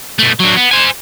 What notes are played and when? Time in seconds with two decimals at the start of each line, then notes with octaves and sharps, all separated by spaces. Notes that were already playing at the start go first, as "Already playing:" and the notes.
0.19 B2 A3
0.39 F#3 D4
0.56 B3
0.71 C5 G#5